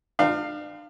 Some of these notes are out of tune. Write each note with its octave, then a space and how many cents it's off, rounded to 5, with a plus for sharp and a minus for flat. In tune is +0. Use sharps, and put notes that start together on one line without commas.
D4 +40 C5 -45 F5 +0